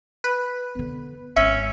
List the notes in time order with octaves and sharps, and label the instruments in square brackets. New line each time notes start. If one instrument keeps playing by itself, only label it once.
[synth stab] B4
[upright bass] D3 B3
[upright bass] G#1 [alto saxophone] C#4 [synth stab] E5